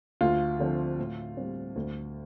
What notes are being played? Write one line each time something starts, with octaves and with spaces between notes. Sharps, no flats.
D2 F4
D3 F3 C4
A2
G3 C4
D2